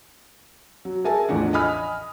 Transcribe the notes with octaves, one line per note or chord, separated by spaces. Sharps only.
F#3
G#4 A#4 E5 G#5 A5
A1 E2 A2 F3 D4 F#5
D#5 G#5 B5 D#6 F6